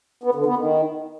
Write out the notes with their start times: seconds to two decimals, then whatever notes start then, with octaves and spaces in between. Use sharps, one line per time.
0.24 B3
0.35 D3
0.46 B3
0.57 D#3